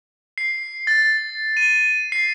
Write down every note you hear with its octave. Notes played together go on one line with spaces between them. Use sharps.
C7
A6
D#7
C7